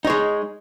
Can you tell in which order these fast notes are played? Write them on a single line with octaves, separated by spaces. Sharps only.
D#4 C#5 G#3